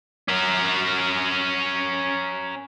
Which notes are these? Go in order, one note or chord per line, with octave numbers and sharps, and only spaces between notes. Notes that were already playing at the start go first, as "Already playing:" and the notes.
C#4 A#4